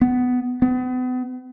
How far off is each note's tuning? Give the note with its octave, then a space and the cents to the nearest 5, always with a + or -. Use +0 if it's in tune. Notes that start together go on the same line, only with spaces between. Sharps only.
B3 +15
B3 +40